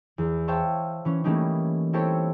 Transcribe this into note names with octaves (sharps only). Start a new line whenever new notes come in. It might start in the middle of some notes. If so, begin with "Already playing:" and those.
E2
C5 C#5 E5 F5 G5 A5
E3 C#4
E3 G3 A3 A#3 C#4 D#4
C4 E4 G4 A4 C5 C#5